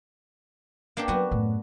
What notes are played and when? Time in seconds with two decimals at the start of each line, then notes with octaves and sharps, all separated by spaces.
0.97 A#3 D4 G4
1.08 F#3 B3 F#4
1.31 F#2 A2